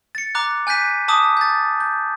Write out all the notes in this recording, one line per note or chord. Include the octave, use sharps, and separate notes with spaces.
A6 C#7
A#5 D6 F#6
G#5 F#6 G6 B6 D#7
A5 D6 D#6
G6 A6
G6